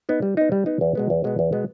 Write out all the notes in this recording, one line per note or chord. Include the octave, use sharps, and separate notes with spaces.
B3 D#4
G3
B3 D#4
G3
B3 D#4
E2
B2 G#3 B3
E2
B2 G#3 B3
E2
B2 G#3 B3